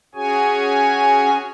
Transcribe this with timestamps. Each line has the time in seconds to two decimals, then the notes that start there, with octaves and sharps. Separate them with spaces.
0.15 C#4 F#4 G#4 C#5 G#5